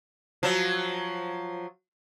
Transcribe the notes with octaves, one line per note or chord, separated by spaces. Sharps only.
F3 F#3